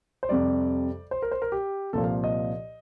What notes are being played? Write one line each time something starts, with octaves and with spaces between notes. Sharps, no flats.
C5
F2 C3 G3 D5
C5
A#4
C5
A#4
G4
C2 A#2 F3 A4
F5
D#5